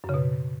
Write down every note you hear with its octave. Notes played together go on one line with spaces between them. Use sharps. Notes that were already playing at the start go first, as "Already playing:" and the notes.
F#2
C#3
B2